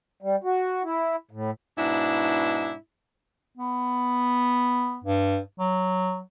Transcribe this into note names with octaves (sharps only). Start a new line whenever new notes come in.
G3
F#4
E4
A2
G#2 B2 D4 E4
B3
G2
F#3